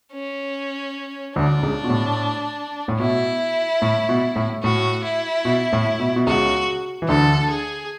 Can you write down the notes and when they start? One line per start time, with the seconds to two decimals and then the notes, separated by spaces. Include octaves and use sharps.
0.13 C#4
1.36 D2 D3 D4
1.63 C#2 C#3
1.84 B2
1.90 A2
2.88 A2
3.00 B2 E4
3.82 A2
4.09 B2
4.36 A2
4.63 A2 F#4
5.04 E4
5.45 B2
5.73 A2
5.99 B2
6.16 B2
6.27 C#2 C#3 F#4
7.02 E3
7.08 D2 D3 A4
7.50 G#4